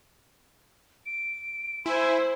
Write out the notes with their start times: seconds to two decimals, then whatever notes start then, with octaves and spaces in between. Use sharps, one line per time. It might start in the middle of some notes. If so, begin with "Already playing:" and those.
1.06 D7
1.86 E4 C5 G#5